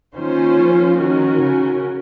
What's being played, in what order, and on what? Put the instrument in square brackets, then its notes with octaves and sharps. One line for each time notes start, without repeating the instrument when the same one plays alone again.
[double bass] D#3 [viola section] A#3 C#4 F4 C5
[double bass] F3
[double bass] D#3 [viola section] C#4 F#4 A#4
[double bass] C#3